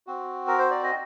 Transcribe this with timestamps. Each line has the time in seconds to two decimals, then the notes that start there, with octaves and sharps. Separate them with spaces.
0.07 C4 F#4
0.48 A#4
0.59 C5
0.71 D5
0.83 D#5